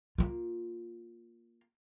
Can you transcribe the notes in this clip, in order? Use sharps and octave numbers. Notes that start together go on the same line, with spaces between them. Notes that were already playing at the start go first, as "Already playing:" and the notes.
A#3 F4